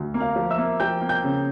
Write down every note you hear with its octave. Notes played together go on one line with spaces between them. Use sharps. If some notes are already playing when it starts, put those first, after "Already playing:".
Already playing: D2
A#3
F5 F6
F3
E5 E6
A#3
F3 G5 G6
A#3
G5 G6
C#3